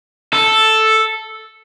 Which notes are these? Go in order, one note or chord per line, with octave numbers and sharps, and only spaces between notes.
A4